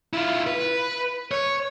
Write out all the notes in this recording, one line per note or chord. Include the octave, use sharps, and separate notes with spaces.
E4 F4
B4
C#5